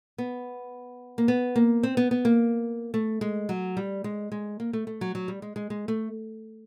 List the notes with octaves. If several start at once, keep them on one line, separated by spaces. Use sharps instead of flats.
B3
A#3
B3
A#3
C4
B3
B3
A#3
A3
G#3
F#3
G3
G#3
G#3
A#3
A3
A3
F#3
F#3
G3
G#3
G#3
G#3
A3